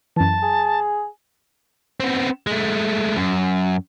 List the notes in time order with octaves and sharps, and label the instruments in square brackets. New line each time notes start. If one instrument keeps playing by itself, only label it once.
[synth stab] F#2 E3 [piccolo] A5
[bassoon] G#4
[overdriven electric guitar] B3 C4
G#3 A3
F#2